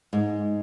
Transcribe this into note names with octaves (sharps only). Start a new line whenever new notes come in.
G#2